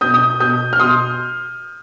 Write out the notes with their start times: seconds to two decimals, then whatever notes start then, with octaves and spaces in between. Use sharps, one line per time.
0.01 B2 D#6 G6
0.14 D#6 G6
0.40 B2 D#6 G6
0.73 F6
0.79 B2 C6 D#6